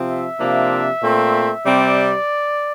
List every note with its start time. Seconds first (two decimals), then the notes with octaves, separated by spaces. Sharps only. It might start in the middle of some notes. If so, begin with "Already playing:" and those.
Already playing: C3 F3 C4
0.08 E5
0.40 C3 F3 A#3 D4
1.02 A#2 A3 C4
1.65 C3 G3 C4 D5